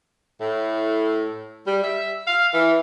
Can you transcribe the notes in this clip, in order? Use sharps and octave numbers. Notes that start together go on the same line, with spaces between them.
A2
G3
E5
F5
E3